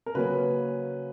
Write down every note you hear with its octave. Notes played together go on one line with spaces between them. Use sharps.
A#4
C#3 F#3 A#3 C#4 B4